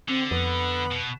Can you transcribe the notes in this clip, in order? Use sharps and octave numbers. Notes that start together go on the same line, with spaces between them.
D3 C4
F2 B3 B5
B2